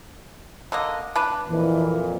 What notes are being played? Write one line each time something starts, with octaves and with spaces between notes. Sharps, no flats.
D3 A#3 D#5
D4 B4
F2 A#2 E3